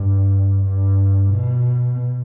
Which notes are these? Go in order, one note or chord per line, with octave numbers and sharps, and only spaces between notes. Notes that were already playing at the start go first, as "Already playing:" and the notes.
Already playing: G2
G2
B2